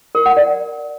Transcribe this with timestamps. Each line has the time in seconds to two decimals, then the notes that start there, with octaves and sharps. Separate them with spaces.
0.15 A#4
0.26 F#5
0.37 D5